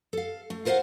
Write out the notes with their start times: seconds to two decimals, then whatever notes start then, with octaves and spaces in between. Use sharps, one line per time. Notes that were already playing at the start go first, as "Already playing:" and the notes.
0.13 A4 F5
0.50 A3
0.65 F4 A#4 C5 D5 F5 F#5